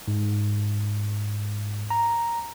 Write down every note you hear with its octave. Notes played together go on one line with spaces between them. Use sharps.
G#2
A#5